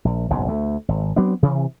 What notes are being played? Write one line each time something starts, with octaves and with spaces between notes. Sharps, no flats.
A#1
F#1 B1 G#2
D2 A3
G#1
F#3 B3 C4 D4
C3 E3